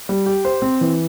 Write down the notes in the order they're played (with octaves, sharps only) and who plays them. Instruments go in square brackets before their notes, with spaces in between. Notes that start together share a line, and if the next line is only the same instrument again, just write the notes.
[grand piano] G3
G4
C5
C4
E3